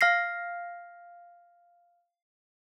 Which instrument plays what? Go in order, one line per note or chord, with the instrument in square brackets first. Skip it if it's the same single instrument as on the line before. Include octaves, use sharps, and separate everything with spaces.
[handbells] F5 F6 A#6 C7